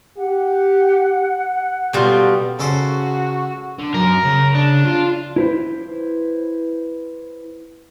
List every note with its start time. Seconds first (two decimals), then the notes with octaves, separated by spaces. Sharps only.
0.17 G4 F#5
1.93 B2 G3 F4 A4
2.59 C#3 F#4 A4 C5
3.79 D3
3.94 F#2 A#4
4.25 C#3
4.55 D4
4.85 F4
5.36 E4 B4 C5